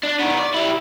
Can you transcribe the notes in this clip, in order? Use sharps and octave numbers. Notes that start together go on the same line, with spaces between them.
D4
D#3 B3
D5
E4 G4